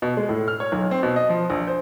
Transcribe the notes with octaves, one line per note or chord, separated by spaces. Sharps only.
B2
G#3
A2
F6
C#5
B1
C4
B2
D#5
F3
A#1
C5